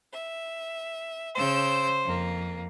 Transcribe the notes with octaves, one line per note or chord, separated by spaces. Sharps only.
E5
C#3 C5 E6 G6
F2 A#3